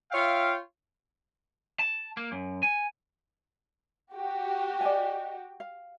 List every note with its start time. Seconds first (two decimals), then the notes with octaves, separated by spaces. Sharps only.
0.12 F4 C#5 E5 F5 G5
1.79 A5
2.17 A#3
2.32 F#2
2.63 G#5
4.12 F#4 G4
4.81 D5 D#5 G#5
5.60 F5